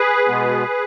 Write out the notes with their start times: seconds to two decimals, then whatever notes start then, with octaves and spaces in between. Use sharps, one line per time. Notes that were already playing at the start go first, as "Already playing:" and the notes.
Already playing: G#4 B4
0.28 B2 G#3 B3